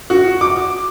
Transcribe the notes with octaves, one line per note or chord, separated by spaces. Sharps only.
F#4
D6